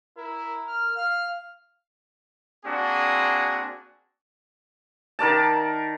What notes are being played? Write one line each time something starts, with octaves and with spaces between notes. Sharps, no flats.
E4 A#4
F6
F5 F6
A#3 C4 D4 F#4 G#4
D#3 A#4 D5 A5